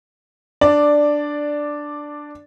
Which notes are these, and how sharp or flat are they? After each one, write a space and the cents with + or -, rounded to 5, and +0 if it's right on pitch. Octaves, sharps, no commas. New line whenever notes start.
D4 +5 D5 +0